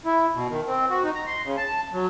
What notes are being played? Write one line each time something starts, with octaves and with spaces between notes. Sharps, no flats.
E4
B2
D#3
C4
F#4
D#4
A#5
C6
C#3
A5
F#3